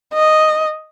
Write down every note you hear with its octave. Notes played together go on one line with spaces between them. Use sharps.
D#5